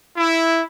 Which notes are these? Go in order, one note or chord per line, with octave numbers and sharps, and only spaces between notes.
E4